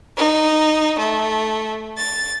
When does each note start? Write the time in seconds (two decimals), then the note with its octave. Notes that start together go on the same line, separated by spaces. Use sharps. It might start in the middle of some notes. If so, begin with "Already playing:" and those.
0.15 D#4
0.98 A3
1.97 A6